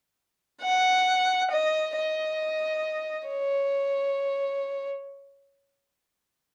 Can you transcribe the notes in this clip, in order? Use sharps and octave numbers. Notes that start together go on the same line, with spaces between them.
F#5
D#5
D#5
C#5